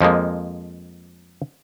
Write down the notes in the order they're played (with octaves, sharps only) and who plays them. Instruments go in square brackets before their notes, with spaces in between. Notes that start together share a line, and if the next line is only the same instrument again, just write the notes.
[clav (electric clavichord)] F2 F3 G#3 A#3